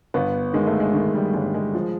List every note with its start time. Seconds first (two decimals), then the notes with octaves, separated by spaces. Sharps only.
0.14 G1 B3
0.54 D#3 G#3
0.66 A3
0.80 G#3
0.93 D#3
1.14 G3
1.34 G1 G#3
1.54 G#3
1.75 F3